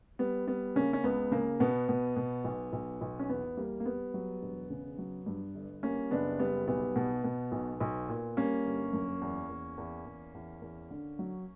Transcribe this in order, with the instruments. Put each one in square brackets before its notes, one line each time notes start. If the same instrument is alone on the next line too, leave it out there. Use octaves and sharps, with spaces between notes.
[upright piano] G3 B3
G3 B3
C#3 A#3 C#4
C#4
C#2 B3
C#3 A#3
B2 B3
B2
B2
B1
B1
B1
C#4
E2 B3
G3 A#3
A#3
G3 B3
F#3
E1
C#3
F#3
G2
G1
G3 A#3 C#4
F#1 B3 D4
G3 B3
B1 B3
B2
B2
B1
B1
A#2
G3 A#3 C#4
G1
F#2
E2
E2
E2
E2
E2
E2
D3
F#3